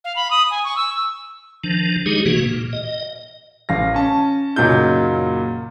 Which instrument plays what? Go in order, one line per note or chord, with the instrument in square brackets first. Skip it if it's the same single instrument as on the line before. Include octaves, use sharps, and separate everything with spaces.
[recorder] F5
B5
D#6
G#5
C#6
E6
[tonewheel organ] D#3 F3 D4
F#3 G#3 D#4 G4 G#4
C3 E3 A#3 F#4
A#2
D#5
[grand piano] A1 F5 A#6
C#4 A5
F#1 A#2 F#3 D#4 F4 G6